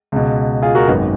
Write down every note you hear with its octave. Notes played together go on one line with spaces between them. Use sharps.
C#2 B2
F4 G#4
F#4 A#4
G#1 F#2 D#3 B3 D#4